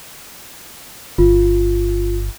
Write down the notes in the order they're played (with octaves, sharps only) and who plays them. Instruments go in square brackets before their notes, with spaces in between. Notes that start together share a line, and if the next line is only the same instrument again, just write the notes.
[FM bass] G1 [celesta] F4